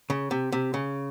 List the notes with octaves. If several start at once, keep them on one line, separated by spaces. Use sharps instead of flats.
C#3
C3
C3
C#3